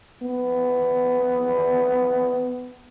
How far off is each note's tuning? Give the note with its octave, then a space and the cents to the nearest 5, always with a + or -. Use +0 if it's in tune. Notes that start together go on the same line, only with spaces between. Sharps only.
B3 +15